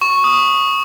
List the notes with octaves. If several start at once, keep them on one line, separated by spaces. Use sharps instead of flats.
C#6
D#6